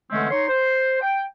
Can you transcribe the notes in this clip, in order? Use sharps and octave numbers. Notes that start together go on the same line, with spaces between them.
D3 E3 G#3 A3 C4 C#4
D#4 C#5 C6
C5
G5